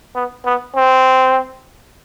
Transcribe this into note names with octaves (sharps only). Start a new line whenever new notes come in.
B3
B3
C4